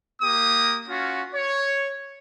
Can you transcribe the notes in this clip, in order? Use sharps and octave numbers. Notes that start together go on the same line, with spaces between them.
A#3 G4 D#6
C#4 F4 F#4
C#5